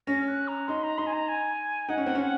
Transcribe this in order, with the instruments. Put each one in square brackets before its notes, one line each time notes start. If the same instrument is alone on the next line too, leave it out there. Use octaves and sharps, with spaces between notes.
[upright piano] C#4 [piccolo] A#6
[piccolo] F6
F#6
A#5
[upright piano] D#4 [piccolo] C6
[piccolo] A#5
[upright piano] D#4 [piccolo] C6
[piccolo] G#5
A#5
G#5
[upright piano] D#4 [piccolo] F#5
[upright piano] C#4
C4
C#4